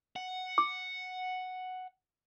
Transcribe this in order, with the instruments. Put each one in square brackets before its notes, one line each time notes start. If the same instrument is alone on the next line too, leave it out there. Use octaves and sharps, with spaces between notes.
[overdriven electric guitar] F#5
[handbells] D6